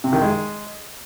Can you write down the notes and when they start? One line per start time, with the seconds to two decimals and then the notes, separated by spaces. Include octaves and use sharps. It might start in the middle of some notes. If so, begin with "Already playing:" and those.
0.04 C3
0.13 D#3
0.22 G#3